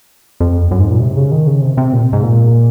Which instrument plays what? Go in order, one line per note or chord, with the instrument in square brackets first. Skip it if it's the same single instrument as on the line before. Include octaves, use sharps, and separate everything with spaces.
[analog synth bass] F2
F#2
G#2
A#2
C3
C#3
D#3
C#3
C3
C3
A#2
G#2
A#2